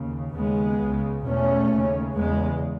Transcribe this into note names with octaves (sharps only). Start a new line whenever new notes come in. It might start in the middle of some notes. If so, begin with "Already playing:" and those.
Already playing: D#2 C#3
D#2 C#3 G#3 B3
C#2 C#3
E2 B2 A3 C#4
D#2 C#3
E2 C#3 G#3 B3